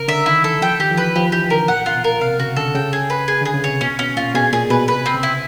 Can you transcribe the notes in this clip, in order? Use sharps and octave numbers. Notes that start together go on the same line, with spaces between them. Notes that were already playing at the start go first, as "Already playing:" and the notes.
Already playing: C#3 A#4
D3 E5
D#3 E4
E3 A4
F3 G5
D#3 G4
F3
E3 B4
F3 G4
E3 G4
D3 A#4
A#2 F#5
F4
B2
A#4
C3 F5
C#3 F#4
D3 A4
C#3 G5
G#4
B4
G#4
D3 G#4
C#3
C3 C#5
B2 C#4
B2 C#4
A#2 F4
B2 G#4
A#2 G#4
B2 B4
C3 B4
C4
C#3
E4